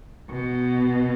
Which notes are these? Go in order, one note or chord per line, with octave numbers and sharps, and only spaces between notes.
B2